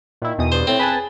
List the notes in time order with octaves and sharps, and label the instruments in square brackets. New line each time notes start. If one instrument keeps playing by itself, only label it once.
[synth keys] A#2 E4 [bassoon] D#3
[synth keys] E2 B2 D#6
[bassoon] G2 [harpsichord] C5
[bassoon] A2 [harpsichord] C4
[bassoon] G#4 [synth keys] B4 G#5 A5